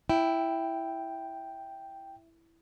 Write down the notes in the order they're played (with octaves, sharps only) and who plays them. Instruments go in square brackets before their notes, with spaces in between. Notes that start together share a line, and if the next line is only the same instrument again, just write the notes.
[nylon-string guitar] E4 [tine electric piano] G5